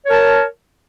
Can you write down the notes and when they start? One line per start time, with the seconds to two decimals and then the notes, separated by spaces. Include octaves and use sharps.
0.05 C#5
0.08 A#4
0.12 A5